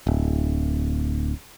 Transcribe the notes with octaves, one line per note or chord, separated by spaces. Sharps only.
D1